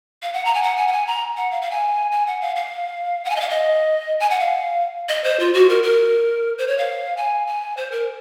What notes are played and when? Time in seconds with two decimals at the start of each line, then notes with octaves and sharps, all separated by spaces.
0.22 F5
0.33 F#5
0.45 A#5
0.55 G#5
0.63 F#5
0.77 G#5
0.88 F#5
0.92 G#5
1.07 A#5
1.37 F#5
1.51 F5
1.62 F5
1.71 G#5
2.12 G#5
2.27 F#5
2.41 F5
2.56 F5
3.25 F#5
3.30 G#5
3.36 D#5
3.40 F5
3.50 D#5
4.20 G#5
4.30 F#5
4.40 F5
5.09 D#5
5.24 C5
5.40 F4
5.54 F#4
5.69 A#4
5.83 A#4
6.58 C5
6.68 C#5
6.78 F5
7.17 G#5
7.47 G#5
7.77 C5
7.92 A#4